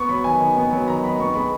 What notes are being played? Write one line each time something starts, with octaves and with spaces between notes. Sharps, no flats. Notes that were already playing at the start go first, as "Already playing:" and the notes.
Already playing: B3 C#6
F#3 B5
D#3 G#5
D#3
B3
F#3
D#3 A#5
D#3 B5
B3 C#6
G#3 B5